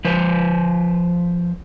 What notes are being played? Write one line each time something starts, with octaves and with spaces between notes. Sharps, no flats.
F3 B4 C5